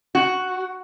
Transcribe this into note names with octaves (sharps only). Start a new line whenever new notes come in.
F#4